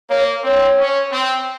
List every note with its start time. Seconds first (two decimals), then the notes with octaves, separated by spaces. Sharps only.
0.09 A#3 C#5
0.44 C4 C#5
0.79 C#4
1.12 C4